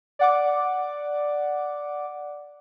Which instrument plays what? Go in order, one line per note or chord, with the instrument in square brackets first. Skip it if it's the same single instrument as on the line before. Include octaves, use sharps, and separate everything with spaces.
[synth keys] D5 F#5 D6